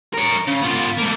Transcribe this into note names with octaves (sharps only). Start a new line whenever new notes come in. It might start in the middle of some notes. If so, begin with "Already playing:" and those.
A#4 C#5
C#3
B3 F4
A3 A#3